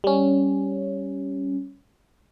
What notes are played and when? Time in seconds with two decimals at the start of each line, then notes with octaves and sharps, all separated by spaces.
0.04 G3 C#4